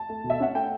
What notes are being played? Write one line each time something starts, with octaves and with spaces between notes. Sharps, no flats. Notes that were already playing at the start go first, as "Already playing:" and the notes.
Already playing: A5
A3
B2
E5
C#4 F#5
A3 G5